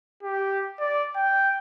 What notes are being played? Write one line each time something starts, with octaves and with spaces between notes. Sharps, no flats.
G4
D5
G5